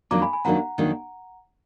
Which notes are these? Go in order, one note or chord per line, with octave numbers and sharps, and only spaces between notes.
F2 D#3 F#3 A#3 D4 A#5 D6
G#5 B5
G#5 B5
F2 D#3 F#3 A#3 D4 F#5 A#5
F2 D#3 F#3 A#3 D4